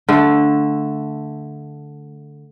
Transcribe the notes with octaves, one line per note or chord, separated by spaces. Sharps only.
D3 A3